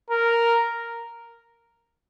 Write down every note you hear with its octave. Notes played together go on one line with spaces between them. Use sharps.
A#4